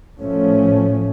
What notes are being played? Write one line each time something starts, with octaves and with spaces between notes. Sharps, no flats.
A2 F3 A3 C#4